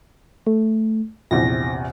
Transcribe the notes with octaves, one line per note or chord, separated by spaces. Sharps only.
A3
A#1 E2 C3 A#6